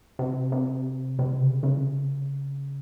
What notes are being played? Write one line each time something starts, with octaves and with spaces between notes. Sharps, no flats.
C3
C3
C3
C#3
C#3